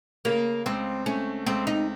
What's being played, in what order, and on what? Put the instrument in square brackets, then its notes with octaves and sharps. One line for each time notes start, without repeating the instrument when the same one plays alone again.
[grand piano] C#3 [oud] A#3
[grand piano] C#2 [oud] C4
[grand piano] A3 [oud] C#4
[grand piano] C#2 [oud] C4
[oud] D#4